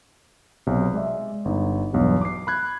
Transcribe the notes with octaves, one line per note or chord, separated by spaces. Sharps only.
B1 C3
G#3 D5 E5
G1 D#4
B1 E2 G2
D6 C7
B5 F#6 G#6